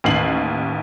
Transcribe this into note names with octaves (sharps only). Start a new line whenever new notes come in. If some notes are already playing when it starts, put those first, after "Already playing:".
A1 D#2 C7 F#7